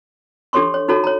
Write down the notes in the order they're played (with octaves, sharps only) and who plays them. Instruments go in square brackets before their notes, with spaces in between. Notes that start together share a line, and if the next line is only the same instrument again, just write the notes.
[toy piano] D4 G4 A4 C#5 C6 C#6
C#5
D#4 F#4 A4 C#5 A#5
C#5 A#5